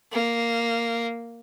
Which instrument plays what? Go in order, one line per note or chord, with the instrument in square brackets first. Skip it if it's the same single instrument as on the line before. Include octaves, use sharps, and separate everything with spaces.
[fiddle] A#3